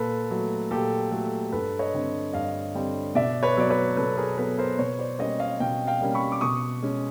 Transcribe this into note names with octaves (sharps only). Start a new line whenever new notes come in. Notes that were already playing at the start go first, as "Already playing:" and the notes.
Already playing: A#2 A4 B4
F#3 A3
A#2 G4 A4
F#3 A3
G2 A4 B4
C#5 D#5
D3 G3 C4
G2 D#5 F5
D3 G3 C4
B2 D5 E5
B4 C#5
F#3 B3 D5
B4 C#5
B2 A4 B4
G#4 A#4
F#3 B3 A4 B4
A#4 C5
B2 B4 C#5
C5 D5
G3 A#3 C#4 C#5 D#5
D#5 F5
B2 F5 G5
F5 G5
G3 A#3 C#4
B5 C#6
D6
B2 C#6 D#6
G#3 C#4